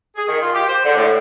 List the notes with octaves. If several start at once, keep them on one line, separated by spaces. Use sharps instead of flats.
G#4
D#3
F4
G4
C5
D3
A2